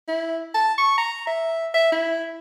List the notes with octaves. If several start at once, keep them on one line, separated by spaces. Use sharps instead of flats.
E4
A5
C#6
A#5
E5
E5
E4